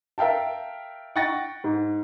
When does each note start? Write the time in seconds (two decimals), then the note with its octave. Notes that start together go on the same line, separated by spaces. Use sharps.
0.18 A#4 E5 F5 G5 A5
1.16 F#5 G5 C#6 A6 A#6
1.64 G#2